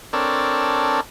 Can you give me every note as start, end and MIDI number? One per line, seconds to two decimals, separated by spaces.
0.13 1.01 60
0.13 1.01 62
0.13 1.01 69
0.13 1.01 70
0.13 1.01 73
0.13 1.01 74